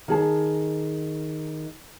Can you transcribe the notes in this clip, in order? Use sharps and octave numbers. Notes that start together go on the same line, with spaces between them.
D#3 G#4 A5